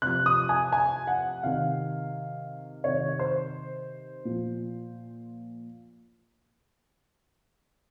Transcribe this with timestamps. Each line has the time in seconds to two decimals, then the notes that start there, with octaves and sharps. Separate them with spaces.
0.02 C3 F3 F#6
0.26 D#6
0.49 G#5
0.72 G#5
1.07 F#5
1.43 C3 D#3 F5
2.84 C3 D#3 C#5
3.19 C5
4.25 A#2 F3